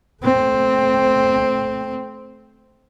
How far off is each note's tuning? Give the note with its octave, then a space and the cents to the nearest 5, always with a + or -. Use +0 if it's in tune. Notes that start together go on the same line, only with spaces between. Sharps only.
A3 -20 C4 +0